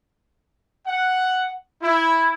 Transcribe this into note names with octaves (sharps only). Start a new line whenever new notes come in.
F#5
E4